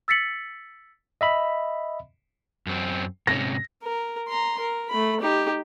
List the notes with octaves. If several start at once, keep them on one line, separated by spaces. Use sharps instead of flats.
E6 A6 B6 C#7 F#7
D#5 E5 B5
F#2 C4
G#2 C3 C#4 A#6
A#4
A#5 C6
A#4
A3 B5
D#4 G4